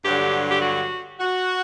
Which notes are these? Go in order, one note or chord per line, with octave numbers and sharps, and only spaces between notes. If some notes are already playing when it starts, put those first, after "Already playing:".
G2 D3 F#3 G4
G4
F#4
F#4